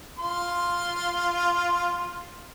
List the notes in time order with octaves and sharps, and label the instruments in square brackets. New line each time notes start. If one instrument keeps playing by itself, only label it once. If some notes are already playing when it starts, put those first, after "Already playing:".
[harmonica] F4 C6